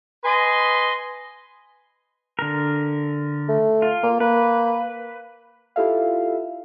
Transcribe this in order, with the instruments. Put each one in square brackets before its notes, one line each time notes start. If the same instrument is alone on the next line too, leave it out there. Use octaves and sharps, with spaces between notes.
[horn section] B4 D#5 G#5 C6
[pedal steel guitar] D3 A#4
[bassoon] A3
[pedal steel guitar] F4
[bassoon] A#3
[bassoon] A#3 [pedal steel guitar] B4
[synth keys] E4 F4 G4 A4 E5 F5